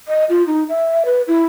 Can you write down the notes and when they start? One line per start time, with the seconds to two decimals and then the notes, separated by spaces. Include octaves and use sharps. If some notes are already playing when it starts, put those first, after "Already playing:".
0.08 D#5
0.29 F4
0.47 D#4
0.69 E5
1.05 B4
1.27 E4